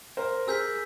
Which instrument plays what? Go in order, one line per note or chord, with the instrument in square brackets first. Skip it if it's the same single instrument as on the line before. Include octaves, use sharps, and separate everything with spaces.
[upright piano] A#4 C5
[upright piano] G#4 A#4 [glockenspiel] E6 G6 B6